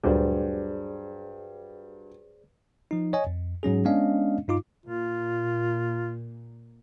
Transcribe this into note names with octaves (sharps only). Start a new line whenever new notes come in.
D2 G2 A#2 F#3 G#4 C5 D5
F3 D#4
C#5 D#5 G#5
F2
G#2 F#3 C#4 G#4
G#3 B3 C#4 D4 D#5 F5
G2 D#4 F4 D6
A#2 F4